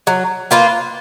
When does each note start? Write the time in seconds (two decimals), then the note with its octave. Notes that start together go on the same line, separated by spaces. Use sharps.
0.07 F#3
0.51 A#3 F4 B4